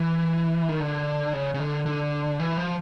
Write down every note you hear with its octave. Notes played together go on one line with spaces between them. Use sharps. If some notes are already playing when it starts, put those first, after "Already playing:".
Already playing: E3
D#3
D3
C#3
C#3
D3
D3
E3
F3